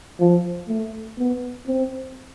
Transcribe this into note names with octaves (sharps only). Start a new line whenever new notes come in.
F3
A3
B3
C4